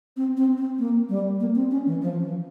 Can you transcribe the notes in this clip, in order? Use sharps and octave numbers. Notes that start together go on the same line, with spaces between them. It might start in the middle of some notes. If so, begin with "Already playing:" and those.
C4
C4
C4
A#3
G3
A#3
C4
C#4
E3
F3
E3